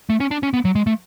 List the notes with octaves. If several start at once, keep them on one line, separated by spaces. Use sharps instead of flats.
A3
C#4
D4
C#4
B3
F#3
G#3
A3